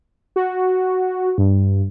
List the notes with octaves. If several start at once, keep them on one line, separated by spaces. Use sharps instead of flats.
F#4
G2